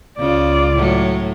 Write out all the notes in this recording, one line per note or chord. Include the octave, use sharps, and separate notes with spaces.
C#2 C#3 F4 D5
A2 F#3